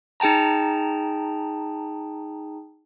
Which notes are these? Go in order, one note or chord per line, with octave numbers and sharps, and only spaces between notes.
D#4 G#4 G5 A5 A#5